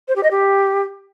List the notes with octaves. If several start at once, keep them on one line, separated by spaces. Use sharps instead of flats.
C5
G4
D#5
G4